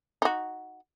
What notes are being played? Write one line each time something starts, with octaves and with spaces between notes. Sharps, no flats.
D#4 F#4